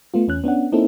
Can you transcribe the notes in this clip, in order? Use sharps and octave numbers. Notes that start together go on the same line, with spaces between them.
A3 B3 F4
E2 C#4 F#6
B3 C#4 D4 F#5
A#3 C4 C#4 D#4 E4 A4